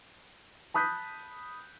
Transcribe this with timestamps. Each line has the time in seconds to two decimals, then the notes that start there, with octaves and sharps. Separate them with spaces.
0.74 A5 B5 D#6 F#6 G6 B6